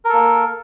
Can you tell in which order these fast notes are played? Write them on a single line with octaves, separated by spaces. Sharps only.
A#4 A4 A#3